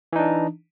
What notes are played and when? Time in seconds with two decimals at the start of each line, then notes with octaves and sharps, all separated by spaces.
0.13 E3
0.16 D#4
0.19 D4